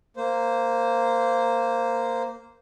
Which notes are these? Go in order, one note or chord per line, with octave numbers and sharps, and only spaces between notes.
A#3 C5